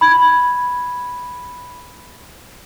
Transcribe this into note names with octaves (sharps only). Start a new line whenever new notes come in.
B5 G#6